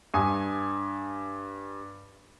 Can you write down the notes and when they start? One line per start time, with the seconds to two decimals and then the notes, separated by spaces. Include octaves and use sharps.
0.14 G2 G#5 D#6